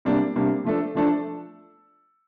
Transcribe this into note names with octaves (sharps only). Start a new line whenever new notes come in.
C3 G3 A#3 D4
C3 G3 A#3 D4
F3 A3 D4 A4
F3 A3 D4 A4